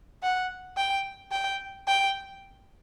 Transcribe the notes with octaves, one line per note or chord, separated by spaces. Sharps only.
F#5
G5
G5
G5